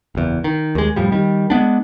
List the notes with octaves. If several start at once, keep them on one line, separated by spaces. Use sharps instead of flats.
F#1 E2
D#3
D#2 G#3
F2 A2 F3 G3
D#3 G3
G#3 A#3 B3 D4